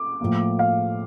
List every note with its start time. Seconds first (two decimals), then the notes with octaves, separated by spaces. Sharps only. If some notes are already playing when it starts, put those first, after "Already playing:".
Already playing: D6
0.21 A2 F3 A#3
0.59 F5